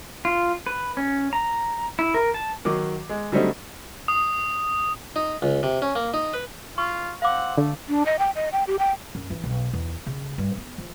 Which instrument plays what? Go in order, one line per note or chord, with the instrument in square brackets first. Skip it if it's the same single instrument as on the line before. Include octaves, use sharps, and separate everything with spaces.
[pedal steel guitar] F4
B4
C#4
A#5
E4
A#4
A5
[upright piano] D#3 F#3 D6
G#3
D3 F#3 G3 A3 C4 D#4
[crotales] D#6
[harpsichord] D#4
C#2
C3
C#4
A#3
D#4
B4
[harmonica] F4 [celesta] C#6
[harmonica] C4 F#5 [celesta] F5 D6
[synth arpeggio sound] D3 [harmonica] A3
[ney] D4
D#5
G5
D#5
G5
G4
G5
[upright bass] F#2
E3
B1
E2
C#3
G2
B3
F3